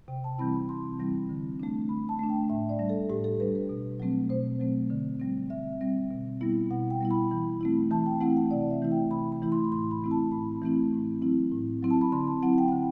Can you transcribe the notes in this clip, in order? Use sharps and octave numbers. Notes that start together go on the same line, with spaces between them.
C3 G5
A5
E3 G3 C4 E4 B5
B5
C3 C6
E3 G3 C4 E4
D3
A3 D4
D3 B5
A5
A3 D4
G5
A2 E5
D5
G3 D4
A4
A2 G4
A4
G3 D4 B4
B4
B2
F#3 A3 C4
B2 C5
F#3 A3 C4
D3
G3 C4
D3 E5
G3 C4
B2
G3 B3 E4
B2 F#5
G5
G3 B3 E4
B5
E3 B5
A3 C4 E4
E3 A5
G5
A3 C4 E4 F#5
F#5
C3 D5
E5
E3 A3 E4
G5
C3 B5
B5
E3 A3 E4
C6
B5
A2 C6
B5
E3 A3 C4 E4
A5
A2 B5
E3 A3 C4 E4
A2
F#3 C4 E4
A2
F#3 C4 E4
A5
B5
D3 C6
A5
F#3 C4 E4 F#5
G5
D3 F#5